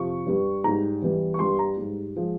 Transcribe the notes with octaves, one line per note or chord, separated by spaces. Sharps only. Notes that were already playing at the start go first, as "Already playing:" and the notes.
Already playing: F2 C3 F3 C#6
G2 G3
G#2 G3 A#5
E2 E3 G3
C#6
G2 G3 C6
A#5
G#2 G3
F3 G#3